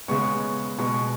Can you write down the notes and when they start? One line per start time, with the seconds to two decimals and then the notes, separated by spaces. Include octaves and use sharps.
0.08 C#3 G#3 B3 C#6
0.78 B2 G#3 B3 C#6